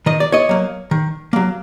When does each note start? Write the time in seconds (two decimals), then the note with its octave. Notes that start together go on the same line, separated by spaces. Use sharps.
0.06 D#3 D#5
0.20 D5
0.32 C#5 D#5
0.49 F#3 A#3
0.91 D#3
1.33 F#3 A#3